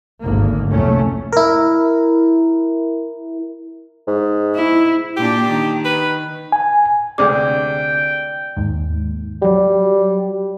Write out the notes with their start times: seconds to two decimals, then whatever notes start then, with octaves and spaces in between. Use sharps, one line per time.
0.20 G#1 D2 A#3
0.69 C2 F2 C3 F#3 A3 C#4
1.32 E4 A#4
4.08 G#2
4.55 E4
5.17 A#2 D4 G4
5.47 D#3
5.85 B4
6.52 G#5
7.18 D2 C3 G#3 D5 G5 D6
8.57 D#2 G#2
9.42 F#3 G3 G4